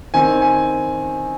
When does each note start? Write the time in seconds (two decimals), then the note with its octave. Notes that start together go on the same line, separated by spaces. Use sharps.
0.14 D#3 C4 G#5
0.42 G#5